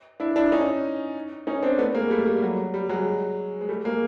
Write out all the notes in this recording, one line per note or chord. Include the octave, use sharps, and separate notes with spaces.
D4 E4
D4 E4
C#4 D#4
C#4 D#4
C4 D4
A3 B3
G#3 A#3
G3 A3
G3
F#3
G3
F#3 G#3
G#3
G3 A3
G#3 A#3